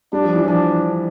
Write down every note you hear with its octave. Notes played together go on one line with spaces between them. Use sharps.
G3 D4
F3
E3
F3 D4